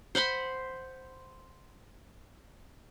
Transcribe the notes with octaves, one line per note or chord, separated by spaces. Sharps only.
C5 F#5 B5 C6